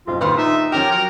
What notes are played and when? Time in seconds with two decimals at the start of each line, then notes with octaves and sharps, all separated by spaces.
0.07 F#1 B1 C4 F4
0.21 A#1 D#3 F4 B4 C5 C6
0.37 D#4 E5
0.72 F3 C#4 G4 A#4 G5
0.92 F#3 A#4